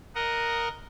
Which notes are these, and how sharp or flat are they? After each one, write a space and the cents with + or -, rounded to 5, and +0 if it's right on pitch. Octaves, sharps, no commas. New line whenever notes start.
A#4 +0 D#5 +0 F#5 +0